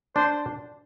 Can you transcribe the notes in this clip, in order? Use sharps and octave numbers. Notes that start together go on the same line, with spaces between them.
D4 C5